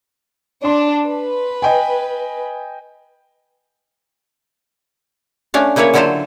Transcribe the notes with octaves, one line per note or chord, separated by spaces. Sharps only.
D4 C6
B4
D#5 G5 G#5
A3 C#4 D4 F5
C#3 A#3 E4 B4 C#5
D3 F#3 E4 F4 A4 C5